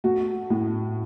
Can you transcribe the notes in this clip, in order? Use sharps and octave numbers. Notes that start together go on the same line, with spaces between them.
A3 F#4
A2